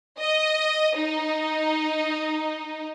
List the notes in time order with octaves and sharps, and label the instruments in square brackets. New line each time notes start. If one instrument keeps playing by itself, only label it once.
[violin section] D#5
D#4